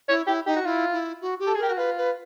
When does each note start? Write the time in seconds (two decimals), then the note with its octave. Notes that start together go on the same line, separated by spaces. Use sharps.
0.09 E4 C#5
0.27 E4 G4
0.46 D#4 G4
0.56 F#4
0.65 E4 F4
0.93 E4
1.21 F#4
1.39 G4
1.47 A4
1.55 G#4
1.59 G4 A#4
1.70 F#4
1.77 F4 B4
1.97 B4